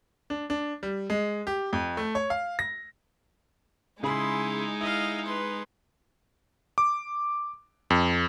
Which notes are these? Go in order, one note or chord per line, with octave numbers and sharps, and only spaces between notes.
D4
D4
G3
G#3
G4
F2
A3
C#5
F5
A#6
C#3 G#3 D#4 E4 G#4 B5 C6
E4 D#5 F5
B4 C6
D6
F2